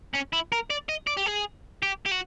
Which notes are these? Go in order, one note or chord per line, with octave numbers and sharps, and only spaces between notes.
C#4
E4
A#4
D5
D#5
D5
G4
G#4
G4
G4
F#4